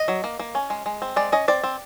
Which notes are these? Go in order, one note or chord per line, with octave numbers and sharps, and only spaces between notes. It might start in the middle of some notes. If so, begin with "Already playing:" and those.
Already playing: D#5
F#3
A#3
A#3
C#4
G#3
G#3
C4
G#3 D5
C#4 D#5
C4 D5
C4